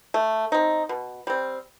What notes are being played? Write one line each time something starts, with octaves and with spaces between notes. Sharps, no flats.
A3
C4 D#4
B2
G3 C4